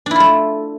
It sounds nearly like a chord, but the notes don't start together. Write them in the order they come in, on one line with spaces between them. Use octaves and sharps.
D4 E4 F4 A3